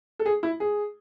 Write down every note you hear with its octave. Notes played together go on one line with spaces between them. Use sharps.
A4
G#4
E4
G#4